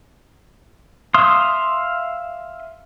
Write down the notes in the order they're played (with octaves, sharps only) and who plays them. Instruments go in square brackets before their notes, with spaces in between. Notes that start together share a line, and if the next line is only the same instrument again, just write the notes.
[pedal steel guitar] E5 F5 C6 D#6